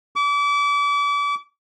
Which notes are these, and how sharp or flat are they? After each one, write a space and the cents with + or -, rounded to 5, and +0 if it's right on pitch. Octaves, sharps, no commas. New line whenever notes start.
D6 -35